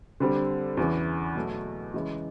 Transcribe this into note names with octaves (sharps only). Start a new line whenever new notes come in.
D3 G3 C4
E2 C#3 E3
B2 F#3 A3
C#3 E3 G#3